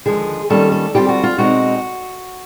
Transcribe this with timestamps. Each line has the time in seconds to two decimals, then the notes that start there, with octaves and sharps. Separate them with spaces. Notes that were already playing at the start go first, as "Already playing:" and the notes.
0.06 D#2 D3 F3 G#3 G#4
0.50 D#3 G3 A#3 C#4 F4 A4
0.72 A4
0.94 D3 G3 C4 F4 G4
1.08 F#4
1.23 F4
1.38 B2 G#3 C4 D#4 F#4